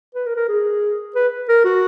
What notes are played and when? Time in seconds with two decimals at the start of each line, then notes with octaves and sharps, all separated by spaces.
0.15 B4
0.26 A#4
0.36 A#4
0.49 G#4
1.15 B4
1.48 A#4
1.65 F#4